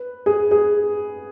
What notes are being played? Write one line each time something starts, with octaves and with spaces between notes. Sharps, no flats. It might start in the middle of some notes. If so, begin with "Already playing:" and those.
Already playing: B4
G#4
G#4